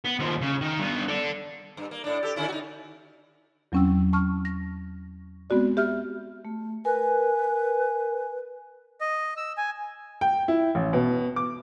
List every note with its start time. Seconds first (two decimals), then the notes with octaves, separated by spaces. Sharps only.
0.05 B3
0.19 D#2 F3
0.41 C#3
0.61 D#3
0.79 G2 B3
1.08 A4 D5
1.77 G2
1.91 A#3
2.04 A2 D4
2.23 G4 A4
2.36 D3 C#4 E4
2.48 D#4 F#4
3.72 E2 F#3 C4 C#4 G5 E6
4.13 A5 C#6 F6
4.45 A#6
5.50 G#3 B3 C4 F#4 D5
5.77 G4 E5 F6
6.45 A3
6.85 A#4 B4 G#5
9.01 D#5
9.37 E6
9.57 G#5
10.21 G5
10.48 E4
10.75 A1
10.93 B2
11.36 D6